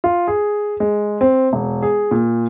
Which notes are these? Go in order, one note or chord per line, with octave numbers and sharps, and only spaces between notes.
F4
G#4
G#3
C4
E1
G#4
A#2